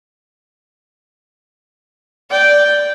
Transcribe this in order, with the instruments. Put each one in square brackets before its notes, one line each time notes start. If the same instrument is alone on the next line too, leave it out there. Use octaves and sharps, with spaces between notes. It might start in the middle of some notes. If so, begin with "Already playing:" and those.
[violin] D5 [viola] G5